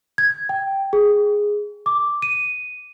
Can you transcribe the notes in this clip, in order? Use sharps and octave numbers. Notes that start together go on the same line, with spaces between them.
G#6
G5
G#4
D6
D#7